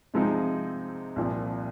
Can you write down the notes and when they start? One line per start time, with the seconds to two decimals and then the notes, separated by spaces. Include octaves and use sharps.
0.14 C3 F3 G#3 C4 D#4
1.16 C2 A#2 F3 C4